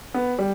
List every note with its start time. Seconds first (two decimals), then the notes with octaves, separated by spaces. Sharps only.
0.14 B3
0.39 G3